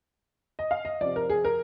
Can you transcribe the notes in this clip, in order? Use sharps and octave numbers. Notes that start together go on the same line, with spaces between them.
D#5
F5
D#5
C3 F3 D5
A#4
G#4
A#4